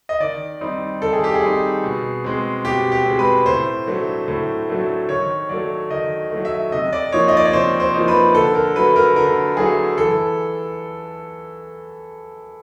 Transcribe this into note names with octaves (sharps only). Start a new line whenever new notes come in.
D#5
D#3 D5
G3 C4 D#4
D#3 A4
G#4
G4
G#4
G3 C4 D#4
B2
G#3 C4
B2 G4
G4
G#3 C4
B4
A2 C5
F#3 A3 D4
A2
F#3 A3 D4
D#3 C#5
F#3 A3 D5
D#3 D#5
F#3 A3
E5
C3 D#5
D5
F3 A#3 D#4 C#5
D#5
D5
C#5
C3 C5
C5
F3 A#3 D#4
B4
D3 A4
A#4
F#3 A3 B4
A#4
D3 A#4
F#3 A3 G#4
E3 A4